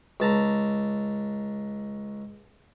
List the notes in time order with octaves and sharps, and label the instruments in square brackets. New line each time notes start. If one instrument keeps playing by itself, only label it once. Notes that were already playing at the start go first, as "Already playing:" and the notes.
[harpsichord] C#2 A5 A#5